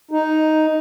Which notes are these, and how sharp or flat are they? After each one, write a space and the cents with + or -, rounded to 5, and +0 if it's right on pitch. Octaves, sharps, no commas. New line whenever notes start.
D#4 +5